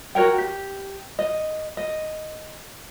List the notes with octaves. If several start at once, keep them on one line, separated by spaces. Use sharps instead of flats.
F#4 A#4 C#5 G5
G4
D#5
D#5